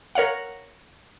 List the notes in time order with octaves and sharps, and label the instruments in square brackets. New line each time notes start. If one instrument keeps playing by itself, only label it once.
[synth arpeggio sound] A#4 C#5 F5 F#5